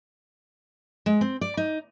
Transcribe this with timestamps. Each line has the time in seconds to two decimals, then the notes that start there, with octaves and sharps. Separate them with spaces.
1.06 G#3
1.21 C4
1.41 D5
1.57 D#4